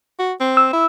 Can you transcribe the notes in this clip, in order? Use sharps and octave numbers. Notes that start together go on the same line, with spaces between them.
F#4
C4
E6
E4